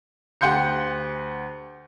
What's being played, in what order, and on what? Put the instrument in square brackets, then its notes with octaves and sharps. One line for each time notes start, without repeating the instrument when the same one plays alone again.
[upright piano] D2 G4 F#5 C6 G6 C#7